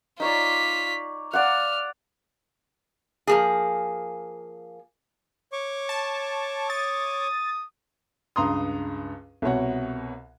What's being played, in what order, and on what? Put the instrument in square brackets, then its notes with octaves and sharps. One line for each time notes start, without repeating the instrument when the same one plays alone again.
[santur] D#4 C#5 D5 [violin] F4 B6
[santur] D5 F5 F#5 [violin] F6
[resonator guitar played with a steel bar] F3 A#3 G#4
[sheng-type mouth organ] C#5 C#6 D6
[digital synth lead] A5
[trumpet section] D#6 [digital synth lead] A6
[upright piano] C#2 G2 A#5 C6 D#6
C2 B2 C#5 F#5